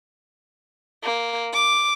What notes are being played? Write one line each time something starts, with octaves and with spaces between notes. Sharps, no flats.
A#3
D6